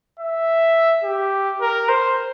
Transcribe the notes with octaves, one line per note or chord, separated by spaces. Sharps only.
E5
G4
A#4
C5